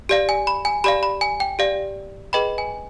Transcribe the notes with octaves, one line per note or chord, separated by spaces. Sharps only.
G4 D5 F5
G#5
B5
G#5
G4 D5 F5 B5
B5
G#5
G5
G4 D5 F5
G#4 B4 D#5 G5 B5
G#5